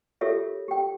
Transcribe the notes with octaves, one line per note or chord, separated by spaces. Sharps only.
F4 G4 A4 A#4 C#5 E5
G4 G5